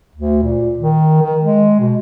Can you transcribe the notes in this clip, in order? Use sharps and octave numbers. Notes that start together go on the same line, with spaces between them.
D2
A#2
D#3
D#3
G#3
B2